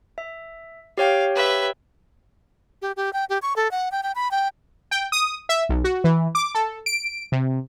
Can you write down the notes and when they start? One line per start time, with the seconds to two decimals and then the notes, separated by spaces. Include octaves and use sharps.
0.18 E5
0.98 G4 C#5 F5 G5
1.35 B4 E5
2.82 G4
2.97 G4
3.13 G5
3.29 G4
3.42 C#6
3.56 A4
3.71 F#5
3.92 G5
4.03 G5
4.15 B5
4.31 G5
4.91 G5
5.12 D#6
5.49 E5
5.69 B1
5.84 F#4
6.04 E3
6.35 D6
6.55 A4
6.86 D7
7.32 C3